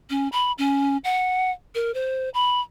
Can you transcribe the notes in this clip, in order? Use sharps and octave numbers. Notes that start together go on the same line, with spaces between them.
C#4
B5
C#4
F#5
A#4
C5
B5